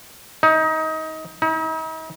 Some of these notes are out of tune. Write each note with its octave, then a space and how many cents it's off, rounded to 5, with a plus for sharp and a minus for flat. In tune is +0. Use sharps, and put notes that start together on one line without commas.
D#4 +25
D#4 +45